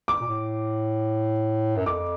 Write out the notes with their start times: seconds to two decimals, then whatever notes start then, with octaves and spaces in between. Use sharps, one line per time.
0.08 D6
0.21 A#2
0.27 A2
1.76 F#2
1.86 F2 D6